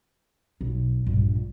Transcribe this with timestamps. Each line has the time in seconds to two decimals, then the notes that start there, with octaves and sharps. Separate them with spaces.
0.61 B1
1.06 A#1 G2